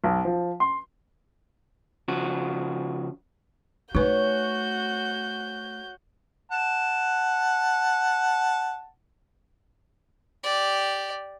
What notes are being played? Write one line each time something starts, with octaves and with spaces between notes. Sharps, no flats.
B1
F3
C6
C#3 F3 F#4
A3 D#4 F#4 B4 C#5 F#5 G#5 G6
F#5 A5
G4 D5